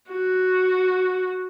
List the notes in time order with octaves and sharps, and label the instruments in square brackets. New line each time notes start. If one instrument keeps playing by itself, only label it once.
[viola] F#4